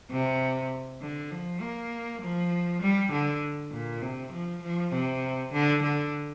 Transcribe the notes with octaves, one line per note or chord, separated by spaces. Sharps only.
C3
D3
F3
A#3
F3
G3
D3
A#2
C3
F3
F3
C3
D3
D3